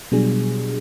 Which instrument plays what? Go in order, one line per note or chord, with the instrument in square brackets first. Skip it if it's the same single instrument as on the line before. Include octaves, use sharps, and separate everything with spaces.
[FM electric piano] B2 F#3 G3 D4 G#4